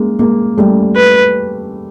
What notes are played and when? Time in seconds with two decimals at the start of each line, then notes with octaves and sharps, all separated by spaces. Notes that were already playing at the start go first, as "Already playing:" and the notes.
Already playing: G#3 A#3
0.19 G#3 A#3
0.58 G3 A3
0.96 B4